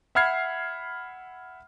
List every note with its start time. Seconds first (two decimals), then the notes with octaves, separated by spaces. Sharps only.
0.15 E5 F#5 B5 F6 G#6 C7